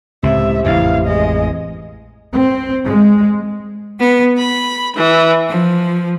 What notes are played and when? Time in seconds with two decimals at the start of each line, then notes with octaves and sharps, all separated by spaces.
0.23 C#2 A2 C3 E5
0.66 A1 F2 E4 F5
1.07 G#3 D#5
2.33 C4
2.85 G#3
3.99 B3
4.38 B5
4.95 E3
5.48 F3